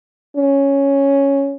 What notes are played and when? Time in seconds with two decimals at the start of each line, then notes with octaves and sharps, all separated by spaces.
0.36 C#4